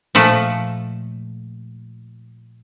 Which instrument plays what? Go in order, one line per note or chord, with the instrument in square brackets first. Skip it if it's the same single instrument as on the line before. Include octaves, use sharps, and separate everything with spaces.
[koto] A#2 F3 A3